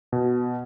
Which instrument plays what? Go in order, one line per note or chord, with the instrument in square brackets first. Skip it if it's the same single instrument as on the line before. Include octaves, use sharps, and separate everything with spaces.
[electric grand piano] B2